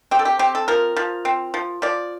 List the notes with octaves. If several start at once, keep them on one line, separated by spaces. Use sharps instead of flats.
C4 G4
A4
G4
C4 G4
A4
F3 A#4
F3
C4
F3
F3 D5